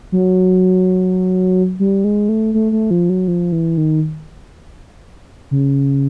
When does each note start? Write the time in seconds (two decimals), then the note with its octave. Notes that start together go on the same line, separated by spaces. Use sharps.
0.12 F#3
1.80 G3
2.04 G#3
2.29 A3
2.54 A3
2.72 A3
2.91 F3
3.09 F#3
3.28 F3
3.52 E3
3.77 D#3
5.51 C#3